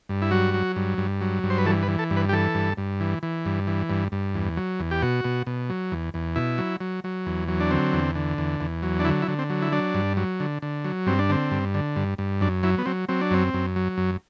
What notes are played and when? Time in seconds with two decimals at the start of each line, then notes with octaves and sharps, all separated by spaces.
0.09 G2
0.22 E4
0.31 F#3 F#4
0.54 F#3
0.76 G2
0.98 G2
1.21 F#3
1.43 G2
1.50 C5
1.58 B4
1.66 E3 A4
1.82 B4
1.88 E3
1.99 A4
2.10 G2
2.17 B4
2.29 G4
2.33 E3 A4
2.55 G2
2.77 G2
3.00 E3
3.23 E3
3.46 G2
3.67 E3
3.89 G2
4.12 G2
4.35 E2
4.57 F#3
4.80 E2
4.91 G4
5.02 B2 F#4
5.25 B2
5.47 B2
5.70 F#3
5.92 E2
6.14 E2
6.36 B2 E4
6.58 F#3
6.81 F#3
7.04 F#3
7.26 E2
7.48 F#3
7.60 D4
7.71 D3 C4
7.93 E2
8.15 D3
8.38 E2
8.60 E2
8.83 F#3
8.99 D4
9.05 D3 E4
9.22 E4
9.28 D3
9.39 C4
9.50 F#3
9.62 E4
9.72 F#3 D4
9.95 G2
10.17 F#3
10.40 D3
10.62 D3
10.84 F#3
11.06 G2 C4
11.19 D4
11.29 D3 C4
11.51 G2
11.74 D3
11.96 G2
12.18 G2
12.41 F#2 D4
12.63 F#3 E4
12.78 B3
12.86 F#3 C4
13.09 F#3 C4
13.21 D4
13.31 F#2 C4
13.54 F#2
13.76 F#3
13.98 F#2